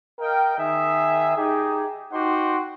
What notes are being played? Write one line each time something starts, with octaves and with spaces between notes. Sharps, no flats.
A#4 D#5 F5 G5
D#3 G#4 E5
D#4 G4 G#4
D#4 F#4 G4 C5 F#5 C6